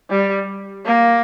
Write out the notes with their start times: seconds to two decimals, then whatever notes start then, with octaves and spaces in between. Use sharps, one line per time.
0.10 G3
0.86 A#3